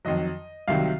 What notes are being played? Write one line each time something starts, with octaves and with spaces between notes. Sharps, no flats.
F2 D#3 F#3 D#5
C2 C3 D#3 F#3 F5